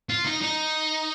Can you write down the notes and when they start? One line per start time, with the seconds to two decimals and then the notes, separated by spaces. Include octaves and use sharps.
0.09 F4
0.25 D#4
0.42 D#4